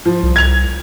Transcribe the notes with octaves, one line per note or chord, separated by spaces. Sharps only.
F3
C2
G#6 F7